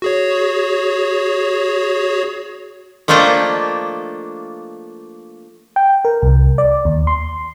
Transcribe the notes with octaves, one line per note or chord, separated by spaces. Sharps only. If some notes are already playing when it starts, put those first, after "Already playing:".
F#4 G#4 C#5
F3 A3 A#3 D4 D#5 G5
G5
A#4
C2
D5
D#2
C6